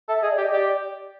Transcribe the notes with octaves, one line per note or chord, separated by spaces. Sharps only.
A4 E5
G#4 D#5
D5
G4
D#5
G4 D5